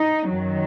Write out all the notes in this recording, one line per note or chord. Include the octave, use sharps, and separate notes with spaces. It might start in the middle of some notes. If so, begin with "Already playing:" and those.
Already playing: D#4
F#2 D#3 F#3